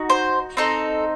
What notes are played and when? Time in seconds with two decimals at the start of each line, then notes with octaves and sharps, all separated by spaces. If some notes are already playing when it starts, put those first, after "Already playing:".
Already playing: D#4 F#4
0.10 C5
0.57 C4 D#4 A4